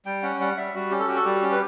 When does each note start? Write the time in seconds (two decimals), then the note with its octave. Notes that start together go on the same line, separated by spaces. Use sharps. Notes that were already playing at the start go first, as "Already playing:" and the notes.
0.05 G3 G5
0.23 C#4 F#5
0.40 G3 F#5
0.57 G3 E5
0.74 G3 F#4
0.91 C#4 G4
0.99 A4
1.08 F#4 G4
1.16 A4
1.24 G3 G4
1.42 C#4
1.52 B4